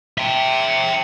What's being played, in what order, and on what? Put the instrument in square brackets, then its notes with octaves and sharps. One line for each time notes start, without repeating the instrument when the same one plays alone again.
[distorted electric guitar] E5 G5